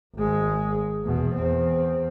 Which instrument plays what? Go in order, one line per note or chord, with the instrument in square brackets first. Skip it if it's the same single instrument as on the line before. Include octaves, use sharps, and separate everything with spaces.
[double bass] G#1 G#3
E2 B2
E2 C4